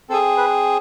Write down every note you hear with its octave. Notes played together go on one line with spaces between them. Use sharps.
C4 G#4 A4
B4